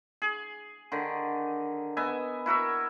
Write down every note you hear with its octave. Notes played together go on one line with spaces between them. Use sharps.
G#4
D3 D#3
B3 D#5 E5 G#5
E4 F#4 A#4 E5